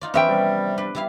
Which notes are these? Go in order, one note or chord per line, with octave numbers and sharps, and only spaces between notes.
D#4 F4 D5
E3 F3 B3 C#4 E5 G5
C3 G3
D4 B4
G3 E4 F5